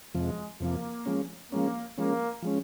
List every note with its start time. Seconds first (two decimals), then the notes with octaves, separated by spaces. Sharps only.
0.14 F2 C3 F3 G#3
0.60 F2 C3 F3 A#3
1.05 F3 G#3 C#4
1.51 F3 G#3 A#3 C#4
1.98 F3 G#3 A#3 C#4
2.42 F3 G#3 C#4